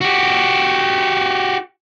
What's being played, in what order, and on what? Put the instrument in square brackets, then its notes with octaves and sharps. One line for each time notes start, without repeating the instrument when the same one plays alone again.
[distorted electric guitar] F#4 G4